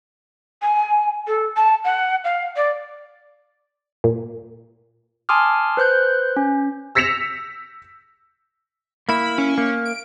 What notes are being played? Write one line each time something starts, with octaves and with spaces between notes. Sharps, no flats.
G#5
A4
A5
F#5
F5
D5
A#2
G#5 A5 C6 D6 D#6 F6
B4 C5 F#6 G6
C#4
E6 A#6 B6 C#7 E7 F7
A#3 E4 B5
C#4
A#3
D7